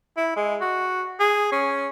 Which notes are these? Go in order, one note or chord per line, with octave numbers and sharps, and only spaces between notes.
E4
G#3
F#4
G#4
C#4